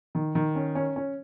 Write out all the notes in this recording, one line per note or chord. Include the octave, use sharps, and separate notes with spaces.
D#3
D#3
C#4
C#4
C#4